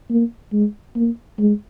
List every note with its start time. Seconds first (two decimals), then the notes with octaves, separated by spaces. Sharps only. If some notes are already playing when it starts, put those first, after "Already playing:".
0.10 A#3
0.52 G#3
0.96 A#3
1.39 G#3